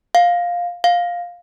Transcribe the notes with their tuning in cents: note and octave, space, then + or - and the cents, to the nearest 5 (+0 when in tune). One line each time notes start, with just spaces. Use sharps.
F5 +10
F5 +10